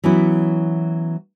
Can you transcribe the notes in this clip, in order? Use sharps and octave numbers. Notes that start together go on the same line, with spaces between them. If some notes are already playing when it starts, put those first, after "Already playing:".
E3 F#3 B3 C#4 E4